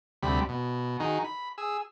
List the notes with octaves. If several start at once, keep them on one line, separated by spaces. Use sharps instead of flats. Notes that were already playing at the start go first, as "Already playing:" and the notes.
D2 C3 G3 B5
B2
D#3 D#4 F#4 G#4
B5
G#4 E6